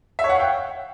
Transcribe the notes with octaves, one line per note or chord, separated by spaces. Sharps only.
E5
C#5
F#5
F5
G5